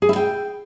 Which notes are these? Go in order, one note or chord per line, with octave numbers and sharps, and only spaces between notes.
G#4
E4
G5